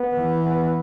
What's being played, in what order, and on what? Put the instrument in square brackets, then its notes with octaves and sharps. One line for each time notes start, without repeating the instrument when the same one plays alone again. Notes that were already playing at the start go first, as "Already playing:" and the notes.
Already playing: [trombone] B3
[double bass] E3
[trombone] B3